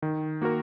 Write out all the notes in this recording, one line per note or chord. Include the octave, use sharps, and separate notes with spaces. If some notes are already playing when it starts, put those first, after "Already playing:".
D#3
A#3 F#4 A#4